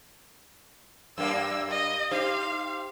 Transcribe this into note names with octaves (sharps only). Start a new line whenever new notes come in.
F#2 G3 A#3 E6
D#5
D#4 G4 C5 F5